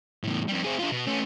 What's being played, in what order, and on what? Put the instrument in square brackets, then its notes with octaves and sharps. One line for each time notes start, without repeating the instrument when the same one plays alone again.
[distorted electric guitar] E2 A2
F2 G3
C4 G#4
D4 F4
B2
A3 C#4